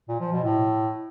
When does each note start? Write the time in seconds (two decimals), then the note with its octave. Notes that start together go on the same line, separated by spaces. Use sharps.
0.09 A#2
0.20 F3
0.32 B2
0.44 A2